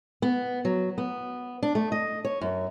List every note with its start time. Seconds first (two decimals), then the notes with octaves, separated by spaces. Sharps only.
0.22 B3
0.65 F#3
0.98 B3
1.63 D4
1.75 A3
1.92 D#5
2.25 C#5
2.41 F#2